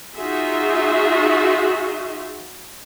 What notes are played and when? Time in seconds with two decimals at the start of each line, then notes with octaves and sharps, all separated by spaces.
0.15 D#4 F4 F#4 G#4 E5